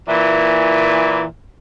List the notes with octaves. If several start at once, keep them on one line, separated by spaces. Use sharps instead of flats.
A#2 E3